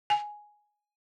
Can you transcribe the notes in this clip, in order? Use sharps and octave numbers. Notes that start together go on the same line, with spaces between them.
G#5